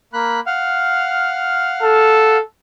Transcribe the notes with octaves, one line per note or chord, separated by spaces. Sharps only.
A#3 B5 F#6
F5 F#5 F6
A4